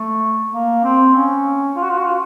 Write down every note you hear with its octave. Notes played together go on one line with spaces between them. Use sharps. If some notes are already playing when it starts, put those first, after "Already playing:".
Already playing: A3
A#3
C4
C#4
F4
F#4
F4
F#4
F4